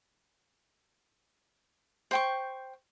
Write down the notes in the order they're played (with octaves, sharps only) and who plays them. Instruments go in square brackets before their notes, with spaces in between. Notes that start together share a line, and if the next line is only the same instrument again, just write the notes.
[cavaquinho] C5 G5 C#6